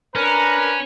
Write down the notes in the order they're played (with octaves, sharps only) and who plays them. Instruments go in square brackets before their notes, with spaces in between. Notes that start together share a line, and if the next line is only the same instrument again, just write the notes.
[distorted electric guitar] C#4 [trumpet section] D4 A#5 [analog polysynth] A#4 F#6 [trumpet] B4